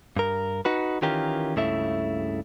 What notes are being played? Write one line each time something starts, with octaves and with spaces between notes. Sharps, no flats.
G2 A#4
D#4 F#4 B4
D#3 E3 C#4 F4 G4 A#4
C#2 G2 C#3 A3 E4 E5